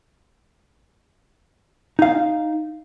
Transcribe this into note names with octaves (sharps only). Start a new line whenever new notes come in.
D#4 F5